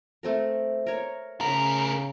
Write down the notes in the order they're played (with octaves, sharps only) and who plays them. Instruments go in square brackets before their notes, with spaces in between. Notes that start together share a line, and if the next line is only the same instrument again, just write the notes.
[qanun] A3 C4 A#4
A#4 C#5
[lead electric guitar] A2 A#4 [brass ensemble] C#3 [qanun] B5